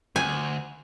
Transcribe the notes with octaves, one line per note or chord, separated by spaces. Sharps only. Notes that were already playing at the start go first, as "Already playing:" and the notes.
D2 G#5